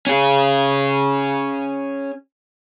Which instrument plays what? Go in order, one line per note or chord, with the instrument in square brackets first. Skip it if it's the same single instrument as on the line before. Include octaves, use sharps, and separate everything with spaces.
[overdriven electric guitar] C#4 G#4